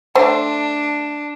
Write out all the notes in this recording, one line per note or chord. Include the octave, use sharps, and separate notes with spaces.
A3 D4 C5